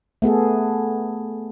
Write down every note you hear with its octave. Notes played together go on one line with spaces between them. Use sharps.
A3 B3 G#4 A4